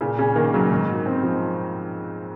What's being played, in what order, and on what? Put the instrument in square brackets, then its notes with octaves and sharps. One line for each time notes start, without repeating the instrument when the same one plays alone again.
[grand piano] A#2 [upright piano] C#3
[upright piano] C#3 [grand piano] C#4
[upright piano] D#3 [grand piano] A#3
[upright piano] C#3 [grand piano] F#3
[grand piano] G#2 [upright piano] D#3
[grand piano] F#4
C4
F3